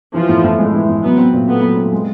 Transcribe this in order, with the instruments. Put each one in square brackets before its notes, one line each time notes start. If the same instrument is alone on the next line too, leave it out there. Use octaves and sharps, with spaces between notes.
[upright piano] E3 [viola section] F3
[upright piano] A2
A2
G#3
E3
A2
[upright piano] F#3 [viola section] B3
[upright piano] C4
A#2
[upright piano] A3 [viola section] B3
[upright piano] F#3
C4
G#3